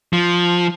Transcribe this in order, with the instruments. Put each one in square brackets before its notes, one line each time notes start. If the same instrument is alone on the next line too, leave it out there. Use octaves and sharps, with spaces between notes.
[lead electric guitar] F3